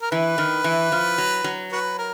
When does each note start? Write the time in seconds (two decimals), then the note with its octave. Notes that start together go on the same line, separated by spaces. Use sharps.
0.02 A#4
0.11 E3 B4
0.38 D#3
0.64 E3
0.92 F3
1.18 F#3
1.44 F#3
1.72 F#4 B4
1.98 A#4